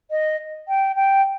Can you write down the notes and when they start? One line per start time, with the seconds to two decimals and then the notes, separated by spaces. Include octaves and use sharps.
0.11 D#5
0.68 G5
0.96 G5